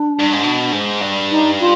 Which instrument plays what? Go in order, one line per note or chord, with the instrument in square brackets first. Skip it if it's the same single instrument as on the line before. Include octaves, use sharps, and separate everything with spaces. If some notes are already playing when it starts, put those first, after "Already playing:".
Already playing: [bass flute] D4
[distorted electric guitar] G2
G#2
B2
G#2
G2
[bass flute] D#4
F4